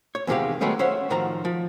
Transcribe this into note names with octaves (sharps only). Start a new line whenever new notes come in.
C#5
E2 C3 D#3 G#3 G4 F5
D#3 F#3 G#3 A3 B3 C#4
C#4 C5 C#5 E5 F#5
A2 D#3 F3 F#4 A#5
F3